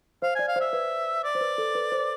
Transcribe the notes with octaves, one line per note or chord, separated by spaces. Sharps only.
C5 F5
D5 G#5
F5
C5 E5
B4
D5
C5
B4
A4
B4
C5